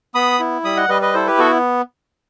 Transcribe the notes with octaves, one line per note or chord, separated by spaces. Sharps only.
B3 B5 D#6
E4
G3 B5 D#6
D#5 F#5
G3 B4 D#5
B4 D#5
E4 A4 C5
G4 B4
B3 F#4 A4